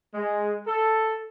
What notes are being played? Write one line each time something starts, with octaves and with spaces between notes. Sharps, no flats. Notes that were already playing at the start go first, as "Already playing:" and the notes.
G#3
A4